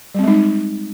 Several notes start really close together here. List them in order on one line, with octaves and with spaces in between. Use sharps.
G3 C4 G#3 D#4